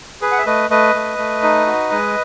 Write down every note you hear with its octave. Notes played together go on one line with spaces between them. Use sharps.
G#4 B4
F#5
E5
A3 B4 D#5
A3 B4 D#5
A3
A3
D#4
F#4
G#3